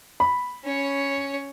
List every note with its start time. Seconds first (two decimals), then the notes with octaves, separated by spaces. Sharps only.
0.20 B5
0.64 C#4 C#5